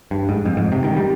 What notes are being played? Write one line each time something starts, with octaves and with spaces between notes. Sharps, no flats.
G2
G#2
F2
G#2
C3
D#3
G3